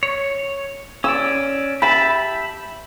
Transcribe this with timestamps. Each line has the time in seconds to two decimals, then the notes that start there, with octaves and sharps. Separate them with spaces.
0.03 C#5
1.04 C#4 D5 E6
1.82 G4 E5 A5 B5